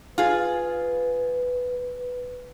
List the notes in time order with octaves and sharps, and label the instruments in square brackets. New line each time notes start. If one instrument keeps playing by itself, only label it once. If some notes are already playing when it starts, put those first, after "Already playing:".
[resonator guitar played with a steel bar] F4 G#4 [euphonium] B4